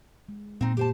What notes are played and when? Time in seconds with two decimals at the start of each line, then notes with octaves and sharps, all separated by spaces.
0.29 G#3
0.61 A#2 C4 D#4
0.77 G4 C5 A5